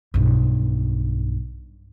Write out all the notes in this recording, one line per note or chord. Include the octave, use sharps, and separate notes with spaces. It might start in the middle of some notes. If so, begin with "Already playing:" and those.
B1 G2